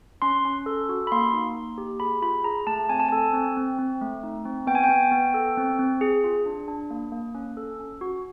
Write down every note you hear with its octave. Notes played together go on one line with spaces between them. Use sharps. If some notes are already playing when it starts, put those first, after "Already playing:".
C#4 C6
C#4
A4
F#4
B5
A#3 C6
D#4
A#3
G4
G#4 B5
F4 B5
G#4 A#5
A3 A5
C4 G#5
A5
A4 G#5
C4
C4
C4
A3
D#4
C4
B3 G5
G#5
G5
B3
B3
A4
C4
C4
G#4
F4
D4
D4
A#3
A#3
C#4
A4
C#4
F#4